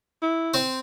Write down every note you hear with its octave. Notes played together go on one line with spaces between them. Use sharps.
E4
C4 C5